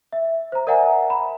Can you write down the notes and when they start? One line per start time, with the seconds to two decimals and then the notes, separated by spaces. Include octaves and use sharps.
0.13 E5
0.52 C5 A#5
0.67 A#4 D5 E5 F#5 G#5 A#5
1.10 B5